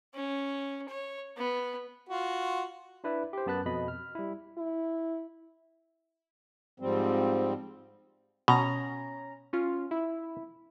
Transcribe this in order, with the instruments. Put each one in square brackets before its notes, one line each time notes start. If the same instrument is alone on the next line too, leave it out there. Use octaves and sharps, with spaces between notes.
[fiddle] C#4
C#5
B3
[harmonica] F4 F#4
[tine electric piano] D4 E4 B4 D5 E5
G4 C5
F#2 B3 A5 B5 F#6 A6
F2 B2 D#5 B5
F6
G3 E4
[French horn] E4
[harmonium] G#2 F3 G3 C4
[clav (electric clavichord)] B2 [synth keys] C#4 A#5
[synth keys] C#4 F4
E4